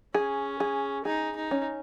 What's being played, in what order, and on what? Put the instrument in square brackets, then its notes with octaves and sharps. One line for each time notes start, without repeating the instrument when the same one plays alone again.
[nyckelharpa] C#4 [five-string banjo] G#4
[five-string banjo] G#4
[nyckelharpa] D#4 [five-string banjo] G#4
[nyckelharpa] D#4
[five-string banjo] C#4